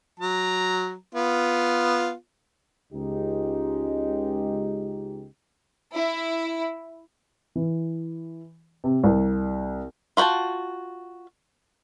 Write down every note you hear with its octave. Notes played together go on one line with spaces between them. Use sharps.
F#3 A#5
B3 F4
C#2 G#3 D#4 G4
E4
E3
C3
C2
F4 F#4 C5 G5 A5